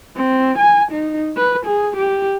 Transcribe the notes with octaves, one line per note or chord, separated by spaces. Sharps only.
C4
G#5
D#4
B4
G#4
G4